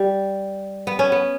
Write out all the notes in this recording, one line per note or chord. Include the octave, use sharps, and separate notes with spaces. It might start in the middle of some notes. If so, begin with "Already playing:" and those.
Already playing: G3
B3
C#4
B3